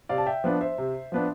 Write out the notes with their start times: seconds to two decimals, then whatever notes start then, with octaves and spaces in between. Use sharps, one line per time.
0.09 C3 D5 F5
0.18 A5
0.26 E5 G5
0.44 F3 B3 D4
0.61 C5 E5
0.78 C3
1.12 F3 B3 D4